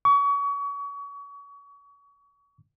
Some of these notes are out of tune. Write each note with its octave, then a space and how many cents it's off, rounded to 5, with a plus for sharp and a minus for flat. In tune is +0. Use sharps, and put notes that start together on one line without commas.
C#6 +35